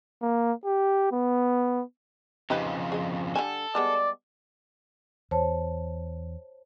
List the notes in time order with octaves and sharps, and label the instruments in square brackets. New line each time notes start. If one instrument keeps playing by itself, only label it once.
[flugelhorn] A#3
G4
B3
[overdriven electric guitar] F2 C#3 [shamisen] D#4 G4 B4
[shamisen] G#4 D#5
[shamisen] D3 G3 G#5 [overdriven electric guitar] A4
[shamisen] G3 G#3 B3 [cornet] D5
[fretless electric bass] E2 [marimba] C5 C#5 A5